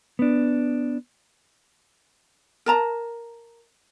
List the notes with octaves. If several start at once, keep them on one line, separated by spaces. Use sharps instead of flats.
B3 D4
A#4 A5 A#5